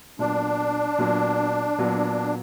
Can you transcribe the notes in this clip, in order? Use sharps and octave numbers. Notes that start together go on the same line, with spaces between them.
A#2 F#3 B3 D4
A#2 F#3 B3
A#2 F#3 B3